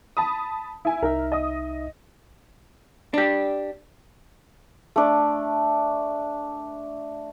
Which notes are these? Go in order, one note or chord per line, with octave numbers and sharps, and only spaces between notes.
A5 B5 D#6
E4 G#5
C2 D#4 A#4 E5
D#5 D#6
D4 G4
A3 D4